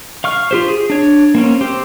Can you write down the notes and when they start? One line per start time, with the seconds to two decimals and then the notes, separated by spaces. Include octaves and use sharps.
0.24 F5 C#6 F6
0.51 F4 G4 C5
0.68 G#4
0.90 D4 C#5
1.35 A#3 C4 C#4
1.61 C4 G4